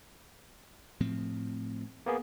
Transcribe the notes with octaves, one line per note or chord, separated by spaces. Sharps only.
A2 F3 C4
A#3 B3 G#4